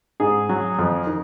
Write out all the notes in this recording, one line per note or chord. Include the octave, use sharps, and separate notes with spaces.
G#2 G#4
F#3
F2
D#3